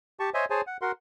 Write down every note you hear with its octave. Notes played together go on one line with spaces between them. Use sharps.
G4 A5 C#6
C5 C#5 D#5 E5 G#5
G#4 C5 C#5 G#5 A5
F#5
F#4 A#4 F#5 C6